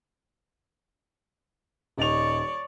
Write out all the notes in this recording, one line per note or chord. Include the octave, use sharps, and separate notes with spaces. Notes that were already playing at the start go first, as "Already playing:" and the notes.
D#1 D#4 C#5 D5 F7